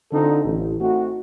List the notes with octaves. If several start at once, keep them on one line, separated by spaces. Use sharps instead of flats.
D3 C4 D4 D#4 F4 A4
A1
A3 C4 D#4 F#4